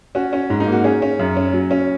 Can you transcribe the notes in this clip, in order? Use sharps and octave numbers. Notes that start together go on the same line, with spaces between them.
C#4 F#4
C#4
G#2
D#4
A#3
F#4
C#4 G#4
C#4
F#2
C#4
F#3
C#4